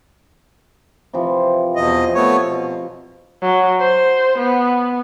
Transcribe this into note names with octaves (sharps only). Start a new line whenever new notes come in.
C3 E3 F3
E2 B2 D#5
A3 B3 C#5
B2
F#3
C5
B3